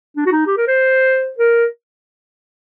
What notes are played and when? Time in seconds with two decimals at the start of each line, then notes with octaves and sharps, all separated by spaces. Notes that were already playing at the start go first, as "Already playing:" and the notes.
0.17 D4
0.26 F#4
0.32 D#4
0.47 G4
0.57 A#4
0.67 C5
1.38 A#4